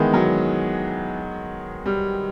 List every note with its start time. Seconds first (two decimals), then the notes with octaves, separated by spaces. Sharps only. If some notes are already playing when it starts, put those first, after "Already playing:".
Already playing: D#3 E3 G#3 B3
0.13 F#3
1.86 G3